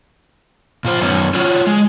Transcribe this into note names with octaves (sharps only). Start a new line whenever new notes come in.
A#2 F4 C5
F#2 D#3 B3 C#4
F4 F#4 C#5
G#3